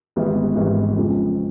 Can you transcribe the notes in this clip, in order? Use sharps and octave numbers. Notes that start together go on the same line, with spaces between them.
G#1 G#2 E3 G3 B3
G#1 G#2 E3 G3 B3
F2 C#3 F3 G#3